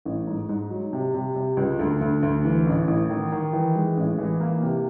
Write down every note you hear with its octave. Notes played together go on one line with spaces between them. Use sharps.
A1
G#2
G#2
F#3
C3
C3
C3
C#2
D2
D2
D2
E3
A1
A1
D#3
D#3
E3
G#3
A1
E3
A#3
C3